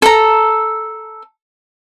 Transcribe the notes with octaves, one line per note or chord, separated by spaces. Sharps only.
A4 A#5